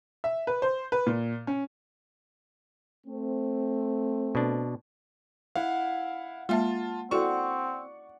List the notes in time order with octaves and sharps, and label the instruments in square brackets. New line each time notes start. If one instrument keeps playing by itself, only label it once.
[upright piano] E5
B4
C5
B4
A#2
C#4
[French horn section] A3 C4
[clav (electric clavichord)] B2 D4
[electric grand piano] E4 F5 [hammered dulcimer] F#5
[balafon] G#3 A#3 E5 [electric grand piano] F4 A5
[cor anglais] C4 [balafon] E4 F#4 A4 [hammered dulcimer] D5 F#5 [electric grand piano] C#6